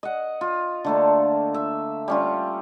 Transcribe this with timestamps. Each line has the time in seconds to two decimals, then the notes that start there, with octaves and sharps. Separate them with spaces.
0.03 D#5 F#5
0.41 F4
0.85 D3 A3 A#3
1.54 E5
2.08 G3 C#4 F4